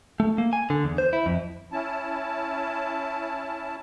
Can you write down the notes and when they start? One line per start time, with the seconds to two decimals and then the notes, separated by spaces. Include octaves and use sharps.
0.20 A3
0.38 A#3
0.53 G#5
0.70 D3
0.84 E2
0.98 C5
1.13 E4
1.26 F2
1.72 C#4 E4 A5